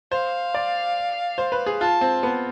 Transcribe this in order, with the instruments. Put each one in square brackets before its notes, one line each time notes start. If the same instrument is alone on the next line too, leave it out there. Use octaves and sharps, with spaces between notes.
[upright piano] C5 [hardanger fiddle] F5
[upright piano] D5
C5
B4
G#4
[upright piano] F4 [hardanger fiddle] A5
[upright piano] C4
B3